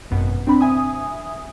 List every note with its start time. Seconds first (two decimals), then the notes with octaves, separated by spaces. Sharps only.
0.11 G#1 F#2 B2
0.47 C4 D4 B5
0.61 E5 G#5 D#6